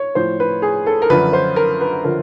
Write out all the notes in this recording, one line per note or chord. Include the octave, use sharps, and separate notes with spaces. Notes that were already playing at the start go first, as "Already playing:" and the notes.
Already playing: C#5
A2 F3 C5
B4
G#4
A4
A#4
F#2 D3 F3 B4
C5
A#4
B4
D3 F3 A#4